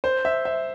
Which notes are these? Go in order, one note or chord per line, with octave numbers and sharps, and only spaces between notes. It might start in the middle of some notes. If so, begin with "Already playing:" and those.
C5
E5
E5